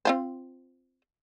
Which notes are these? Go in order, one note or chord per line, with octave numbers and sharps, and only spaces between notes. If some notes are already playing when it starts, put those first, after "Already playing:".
C4 F4 C5